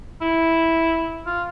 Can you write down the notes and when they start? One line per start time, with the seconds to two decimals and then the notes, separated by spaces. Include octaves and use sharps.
0.22 E4
1.26 F4